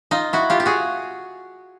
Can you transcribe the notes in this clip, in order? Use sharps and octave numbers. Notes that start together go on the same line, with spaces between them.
D#4 F4
E4 F#4
F4 G4
G4
F#4 G#4